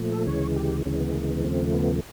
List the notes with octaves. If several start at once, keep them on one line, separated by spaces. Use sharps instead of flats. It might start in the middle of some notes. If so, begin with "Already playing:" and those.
Already playing: A#2 F3 A3
A4
D2 C#3 E3 G#3 C#5
G4
D2 C#3 E3 G#3 C#4
B3
A#3
B3
D#2 C#3 F3 A3 C4
B3
A3